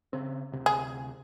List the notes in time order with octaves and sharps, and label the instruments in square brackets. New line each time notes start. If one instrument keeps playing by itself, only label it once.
[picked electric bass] C#3 C4
D2 C3
[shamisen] G#4